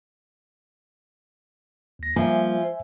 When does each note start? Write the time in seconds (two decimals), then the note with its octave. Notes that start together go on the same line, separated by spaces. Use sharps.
1.99 D#2 A#6
2.16 F3 G3 A#3 C5 E5 G#5